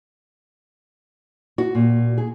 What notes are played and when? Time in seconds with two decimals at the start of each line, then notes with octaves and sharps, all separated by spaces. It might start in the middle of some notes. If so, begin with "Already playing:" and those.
1.58 F#4
1.75 A#2
2.18 G#4